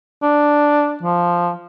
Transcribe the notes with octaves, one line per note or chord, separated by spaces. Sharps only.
D4
F3